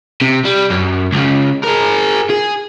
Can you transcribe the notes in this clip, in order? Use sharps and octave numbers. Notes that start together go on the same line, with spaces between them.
C3
G3
F#2
C#2 C#3
G#4 A#4
G#4